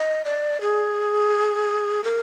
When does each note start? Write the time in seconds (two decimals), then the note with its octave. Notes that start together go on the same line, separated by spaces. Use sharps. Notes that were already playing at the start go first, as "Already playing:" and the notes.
Already playing: D#5
0.25 D5
0.61 G#4
2.04 A#4